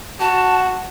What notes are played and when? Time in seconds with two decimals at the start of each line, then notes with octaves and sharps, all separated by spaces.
0.20 F#4 A5